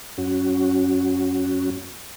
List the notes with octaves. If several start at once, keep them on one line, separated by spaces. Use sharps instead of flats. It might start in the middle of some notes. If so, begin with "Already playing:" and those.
F#2 C#4 F#4